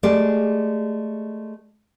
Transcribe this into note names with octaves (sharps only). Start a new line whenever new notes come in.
G#3 A3 G4 G#4 D5